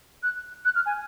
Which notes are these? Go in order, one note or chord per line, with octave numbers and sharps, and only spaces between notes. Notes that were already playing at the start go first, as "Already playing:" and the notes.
F#6
F#6
F6
G#5